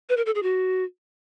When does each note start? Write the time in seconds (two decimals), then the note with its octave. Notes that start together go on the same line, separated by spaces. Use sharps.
0.09 B4
0.17 A#4
0.26 A4
0.35 G#4
0.43 F#4